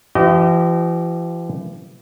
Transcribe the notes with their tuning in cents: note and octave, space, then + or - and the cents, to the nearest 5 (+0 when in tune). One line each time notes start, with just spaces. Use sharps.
E3 +45 G4 -35 D#5 -10